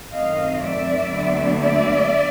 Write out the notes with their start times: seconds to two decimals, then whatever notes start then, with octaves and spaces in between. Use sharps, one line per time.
0.13 F#2 D#3 F#3 A3 C4 D#5 F5
0.62 D5 E5
1.12 D2 D3 F#3 B3
1.62 D5 E5